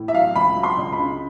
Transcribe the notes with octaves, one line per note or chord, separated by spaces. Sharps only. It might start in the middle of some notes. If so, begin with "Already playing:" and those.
Already playing: A2
E5
F#3 F5
C#2 B5
F#3
C6
C#2
B5
C#3